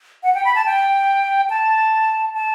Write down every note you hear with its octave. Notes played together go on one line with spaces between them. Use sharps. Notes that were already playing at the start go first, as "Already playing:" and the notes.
F#5
G5
B5
A5
G5
A5
A5